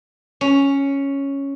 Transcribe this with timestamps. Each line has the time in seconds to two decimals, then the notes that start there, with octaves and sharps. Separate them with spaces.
0.41 C#4